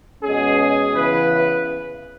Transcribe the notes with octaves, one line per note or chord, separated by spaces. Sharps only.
B2 G#3 C#4 G#4
G#4
C#3 E3 B3 B4